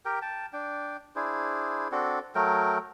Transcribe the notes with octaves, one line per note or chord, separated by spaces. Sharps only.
G4 A#4 G5
G5 A5
D4 G5
D4 E4 G#4 C5
C4 D4 F#4 A4
F#3 A3 A#4 G5